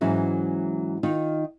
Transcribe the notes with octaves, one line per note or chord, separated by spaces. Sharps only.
G#2 E3 F#3 C#4
D#3 D#4 F4